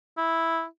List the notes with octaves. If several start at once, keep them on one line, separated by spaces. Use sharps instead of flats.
E4